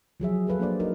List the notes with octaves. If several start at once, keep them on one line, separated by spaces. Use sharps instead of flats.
F3 F#3 G#4 E5
F#4
G#4 A4 B4 F5
A#3 D4 C5 D5
D#4 F#4 A#4 D#5